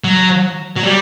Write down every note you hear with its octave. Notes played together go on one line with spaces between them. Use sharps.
F#3
F#3
G3